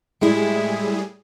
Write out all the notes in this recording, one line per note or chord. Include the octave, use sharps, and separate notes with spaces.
A2 G3 G#3 E4 G#4